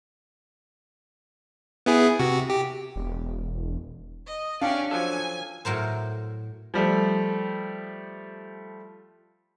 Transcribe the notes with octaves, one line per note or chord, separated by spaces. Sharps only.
B3 E4 G#4
C3 F#4
G4
E1
D#5
C#4 D4 G4 D5 F5
F3 F#3 A4 G#5
A2 F#3 A#4 C5
F3 G3 A3